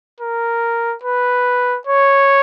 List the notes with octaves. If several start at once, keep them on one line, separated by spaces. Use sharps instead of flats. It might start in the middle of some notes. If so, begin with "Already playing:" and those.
A#4
B4
C#5